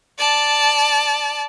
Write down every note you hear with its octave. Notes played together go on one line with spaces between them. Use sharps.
D5 A5